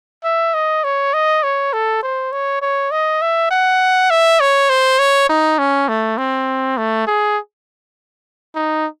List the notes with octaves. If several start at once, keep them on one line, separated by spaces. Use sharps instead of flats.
E5
D#5
C#5
D#5
C#5
A4
C5
C#5
C#5
D#5
E5
F#5
E5
C#5
C5
C#5
D#4
C#4
A3
C4
A3
G#4
D#4